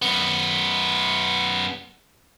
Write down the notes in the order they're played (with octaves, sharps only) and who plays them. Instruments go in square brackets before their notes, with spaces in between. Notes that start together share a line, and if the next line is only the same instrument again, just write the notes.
[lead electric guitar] F#2 B3